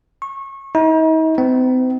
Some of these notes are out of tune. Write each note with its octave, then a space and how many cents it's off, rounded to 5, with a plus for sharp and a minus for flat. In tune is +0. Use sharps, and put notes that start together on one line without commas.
C#6 -25
D#4 +40
C4 -40